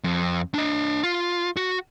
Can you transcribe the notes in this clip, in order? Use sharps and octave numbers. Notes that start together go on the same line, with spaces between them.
F2
D4 D#5
F4
F#4